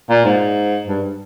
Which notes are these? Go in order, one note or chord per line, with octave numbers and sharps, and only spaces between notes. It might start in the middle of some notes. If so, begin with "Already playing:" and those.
A#2
G#2
G2